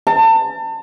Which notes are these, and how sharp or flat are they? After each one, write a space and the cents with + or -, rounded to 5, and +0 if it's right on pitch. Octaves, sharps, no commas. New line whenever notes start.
A5 +35